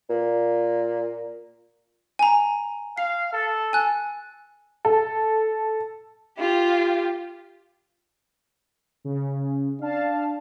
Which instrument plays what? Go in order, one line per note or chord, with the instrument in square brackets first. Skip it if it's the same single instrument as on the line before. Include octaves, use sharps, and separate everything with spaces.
[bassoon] A#2
[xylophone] G#5 A#5
[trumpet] F5 [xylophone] C7
[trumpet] A4
[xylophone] G#5 F#6
[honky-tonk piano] A4
[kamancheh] F4 G4
[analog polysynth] C#3
[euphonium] D4 [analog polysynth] F5 A5